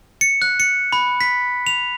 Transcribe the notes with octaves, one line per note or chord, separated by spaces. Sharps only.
C#7
F#6
C#7
B5
B6
F7